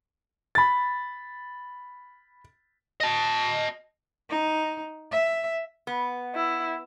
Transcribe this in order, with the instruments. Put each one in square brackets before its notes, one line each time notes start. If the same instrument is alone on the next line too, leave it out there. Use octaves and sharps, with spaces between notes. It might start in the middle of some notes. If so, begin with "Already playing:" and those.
[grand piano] B5 A6
[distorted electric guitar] D#5 A5
[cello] D#4
E5
[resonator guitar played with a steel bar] B3
[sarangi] E4